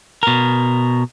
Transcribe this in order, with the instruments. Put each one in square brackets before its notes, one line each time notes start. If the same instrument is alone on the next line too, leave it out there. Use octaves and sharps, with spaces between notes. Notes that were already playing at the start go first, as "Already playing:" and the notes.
[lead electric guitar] B2 A#4